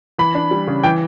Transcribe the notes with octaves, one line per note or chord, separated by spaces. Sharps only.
E3 B5
D4
G3
C#3
E3 G5